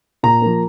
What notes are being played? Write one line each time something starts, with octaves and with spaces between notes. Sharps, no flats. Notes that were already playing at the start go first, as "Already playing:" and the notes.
A#2 A#5
F3 A#3